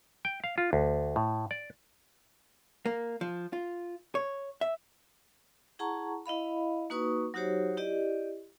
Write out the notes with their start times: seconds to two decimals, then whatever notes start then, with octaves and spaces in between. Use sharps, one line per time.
0.25 G5
0.44 F5
0.58 F4
0.73 D2
1.16 A2
1.51 D5
2.86 A#3
3.21 F3
3.53 F4
4.15 C#5
4.61 E5
5.79 E4 G#4 F#5 A5 A#5 C#6
6.26 E4 D#5 F5 B5
6.90 A#3 D#4 F#4 B4 C#6 D#6
7.34 F#3 D#4 F#4 G4 C5 C#5
7.77 E4 G4 D5 D#5